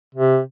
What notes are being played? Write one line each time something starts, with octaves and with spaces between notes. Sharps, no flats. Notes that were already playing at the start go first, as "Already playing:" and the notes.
C3